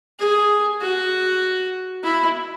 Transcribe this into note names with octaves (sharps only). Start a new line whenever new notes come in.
G#4
F#4
E4